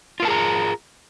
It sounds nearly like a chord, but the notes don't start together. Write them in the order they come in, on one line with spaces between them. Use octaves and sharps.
F4 A#4 A5 G#4 A#5